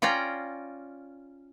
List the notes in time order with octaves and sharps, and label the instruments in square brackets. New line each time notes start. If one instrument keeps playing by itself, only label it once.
[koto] C#4 F4 D5 G5 A#5